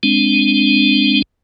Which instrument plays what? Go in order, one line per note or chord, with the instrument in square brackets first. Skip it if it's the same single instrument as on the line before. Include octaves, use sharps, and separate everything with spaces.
[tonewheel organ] G#3 C4 D4